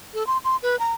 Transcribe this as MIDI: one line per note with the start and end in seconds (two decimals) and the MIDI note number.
0.14 0.26 69
0.27 0.38 84
0.44 0.56 84
0.63 0.78 71
0.79 0.94 82